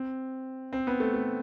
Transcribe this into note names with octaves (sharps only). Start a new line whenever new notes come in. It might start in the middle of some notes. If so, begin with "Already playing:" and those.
Already playing: C4
C4
B3
A3
A3